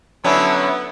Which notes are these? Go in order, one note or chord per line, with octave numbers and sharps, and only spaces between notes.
D3 F#3 B3 C#4 E4